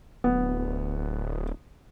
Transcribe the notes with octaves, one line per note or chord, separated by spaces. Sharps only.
D1 B3